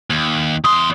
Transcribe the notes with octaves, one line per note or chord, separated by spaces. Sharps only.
D#2
E2 C6 D#6